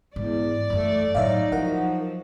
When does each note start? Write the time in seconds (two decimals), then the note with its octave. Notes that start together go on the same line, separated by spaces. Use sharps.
0.16 E2 G#2 D5
0.70 F#2 E3 A3
1.15 A2 F#3 D#4 C#5 E5 F5
1.52 F3 F#3 E4 A#4 F#5